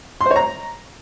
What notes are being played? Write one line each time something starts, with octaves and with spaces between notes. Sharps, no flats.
C6
C5
C#5
A#5